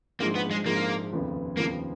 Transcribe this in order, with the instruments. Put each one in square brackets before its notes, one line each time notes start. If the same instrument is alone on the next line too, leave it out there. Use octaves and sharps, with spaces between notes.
[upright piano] A#1 G#2 F3 [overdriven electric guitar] A#3
[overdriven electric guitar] B3
G#3
[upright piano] A#1 G#2 F3 [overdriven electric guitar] A#3
[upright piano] F1 D#2 C#3 F3 B3
[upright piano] F1 D#2 C#3 F3 B3 [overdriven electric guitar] A#3